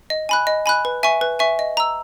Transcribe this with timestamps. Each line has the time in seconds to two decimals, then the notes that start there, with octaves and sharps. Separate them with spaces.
0.10 D#5
0.29 G#5 B5 F#6
0.47 D#5
0.66 G#5 B5 F#6
0.85 B4
1.03 E5 G#5 C#6
1.21 B4
1.39 E5 G#5 C#6
1.59 D#5
1.77 A#5 E6